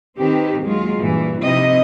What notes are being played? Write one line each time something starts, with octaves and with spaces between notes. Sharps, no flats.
D#3 C4 G4 B4
D#2 F#3 G#3 F4
G2 A#2 E3
C3 F3 C4 D#4 E4 D#5